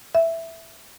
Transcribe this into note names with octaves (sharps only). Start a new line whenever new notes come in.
E5